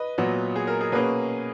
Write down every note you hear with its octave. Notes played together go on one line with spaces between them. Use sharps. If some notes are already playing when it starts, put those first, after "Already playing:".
Already playing: B4 D#5
A#2 F#3 B3
G#4
A#4
G#4
B2 A#3 C#4 G#4 B4